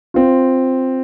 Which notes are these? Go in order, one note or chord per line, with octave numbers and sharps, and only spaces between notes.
C4 F4